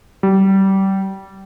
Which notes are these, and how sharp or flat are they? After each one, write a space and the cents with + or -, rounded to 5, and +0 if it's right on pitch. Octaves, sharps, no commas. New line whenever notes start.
G3 -25